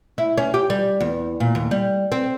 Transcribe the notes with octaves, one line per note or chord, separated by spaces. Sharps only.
E4
C#4
G4
G3
E2
A#2
D#2
G3
C4